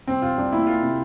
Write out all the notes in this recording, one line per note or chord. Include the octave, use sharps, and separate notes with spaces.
C2 C4
C2 F4
C2 D4
A#2 E4
A#3 F4
C3